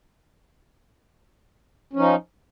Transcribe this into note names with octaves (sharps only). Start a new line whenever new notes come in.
F3 C#4 D#4